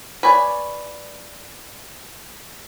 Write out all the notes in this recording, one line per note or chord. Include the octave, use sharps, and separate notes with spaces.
B4 C#5 D5 G#5